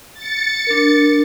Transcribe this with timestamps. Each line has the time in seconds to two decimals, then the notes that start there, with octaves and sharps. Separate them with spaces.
0.14 A6 C#7
0.67 D4 A#4